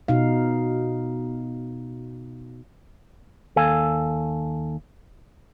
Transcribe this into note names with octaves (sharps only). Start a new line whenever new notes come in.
B2 D#4 F5
D#2 A4 F5 G#5